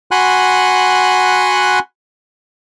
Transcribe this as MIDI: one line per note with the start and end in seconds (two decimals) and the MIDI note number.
0.11 1.79 66
0.11 1.79 78
0.11 1.79 80
0.11 1.79 83
0.11 1.79 84
0.11 1.79 90